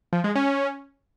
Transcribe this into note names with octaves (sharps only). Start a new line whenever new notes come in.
F3
G#3
C#4